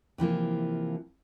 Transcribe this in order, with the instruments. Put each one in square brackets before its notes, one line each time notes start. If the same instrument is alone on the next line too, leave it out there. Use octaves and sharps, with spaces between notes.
[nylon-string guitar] C3 E3 F3 A#3